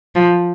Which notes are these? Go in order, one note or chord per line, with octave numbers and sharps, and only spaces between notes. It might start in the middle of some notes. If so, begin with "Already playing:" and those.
F3